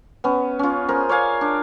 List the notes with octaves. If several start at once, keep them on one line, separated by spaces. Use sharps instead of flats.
B3 C#4
C#4 F4
G#4 A#4 C5
C#5 D5 F5 G#5
D4